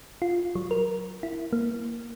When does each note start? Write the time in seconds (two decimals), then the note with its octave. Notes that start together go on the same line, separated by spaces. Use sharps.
0.22 F4
0.55 F#3
0.71 A#4
1.23 E4
1.53 A#3